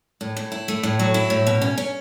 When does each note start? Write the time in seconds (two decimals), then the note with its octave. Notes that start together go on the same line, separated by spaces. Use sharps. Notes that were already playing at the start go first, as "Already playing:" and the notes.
0.21 A2
0.37 A2
0.52 E4
0.68 A3
0.83 A2
0.99 F#3
1.14 E4
1.30 A2
1.47 B2
1.62 C#4
1.78 C#4